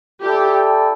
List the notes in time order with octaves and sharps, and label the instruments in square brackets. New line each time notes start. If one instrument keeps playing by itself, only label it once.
[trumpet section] E4 A4 D5 G5 [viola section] G4